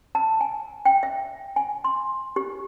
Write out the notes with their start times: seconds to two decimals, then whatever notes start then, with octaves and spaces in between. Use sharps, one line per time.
0.15 A5
0.41 G#5
0.85 G5
1.03 E5
1.56 G#5
1.84 C6
2.36 G4